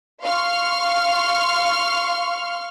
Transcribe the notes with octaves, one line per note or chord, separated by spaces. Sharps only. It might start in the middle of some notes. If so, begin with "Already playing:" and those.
F5 C6 C#6 F6